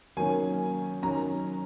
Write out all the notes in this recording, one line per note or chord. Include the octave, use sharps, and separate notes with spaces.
D#3 F#3 A#3 C#4 G#5
D#3 F#3 C#4 A#5